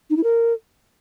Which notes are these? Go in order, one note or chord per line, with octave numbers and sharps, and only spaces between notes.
D#4
E4
A#4